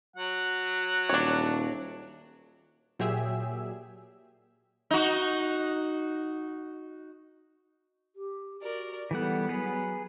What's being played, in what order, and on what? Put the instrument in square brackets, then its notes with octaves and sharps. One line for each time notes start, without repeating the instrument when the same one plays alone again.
[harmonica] F#3 F#5
[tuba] D#1 [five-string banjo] D4 C#5
[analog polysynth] A#2 F#3 G4 G#4 E5
[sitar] D#4 F#4
[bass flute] G4
[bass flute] F#4 [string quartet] A#4 D5
[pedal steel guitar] E3 G3 F#5 [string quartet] B3 [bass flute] A4
[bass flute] F#3 [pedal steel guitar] G#4 B4